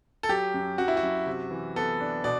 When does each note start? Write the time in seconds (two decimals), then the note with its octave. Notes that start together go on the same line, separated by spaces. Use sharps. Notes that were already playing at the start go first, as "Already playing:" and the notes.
0.23 A4
0.29 F#3 G4
0.54 F#2
0.78 F#2 F#4
0.88 E4
0.97 F#4
1.03 F#2
1.27 C3
1.51 E3
1.76 B3 A4
2.01 D4
2.24 B2 D5